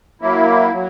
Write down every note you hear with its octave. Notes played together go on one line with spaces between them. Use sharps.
F#3 A#3 E4
F#3